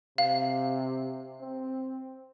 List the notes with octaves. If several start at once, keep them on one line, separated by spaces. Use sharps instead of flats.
C3 F5
C4